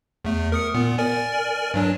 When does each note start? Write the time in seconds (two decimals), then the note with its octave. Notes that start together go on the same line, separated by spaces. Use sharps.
0.25 E2 A3
0.52 A#4 D#6 C#7
0.74 A#2 B3
0.98 A#4 D5 G#5
1.74 G2 F#3 D4